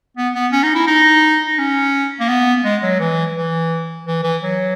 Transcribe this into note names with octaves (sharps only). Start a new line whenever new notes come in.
B3
B3
C#4
D#4
E4
D#4
D#4
C#4
A#3
B3
G#3
F#3
E3
E3
E3
E3
F#3